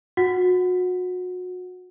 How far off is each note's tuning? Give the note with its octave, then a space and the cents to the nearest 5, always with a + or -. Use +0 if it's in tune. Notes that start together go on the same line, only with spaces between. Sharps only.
F#4 -30 F#5 +0